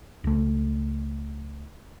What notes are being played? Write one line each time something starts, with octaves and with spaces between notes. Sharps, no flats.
C#2 A3